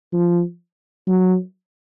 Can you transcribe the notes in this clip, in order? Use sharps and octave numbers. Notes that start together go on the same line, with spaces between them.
F3
F#3